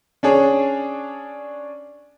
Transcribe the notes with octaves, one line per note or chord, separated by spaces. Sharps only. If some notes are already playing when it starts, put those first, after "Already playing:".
C#4 D4 G#4 C#5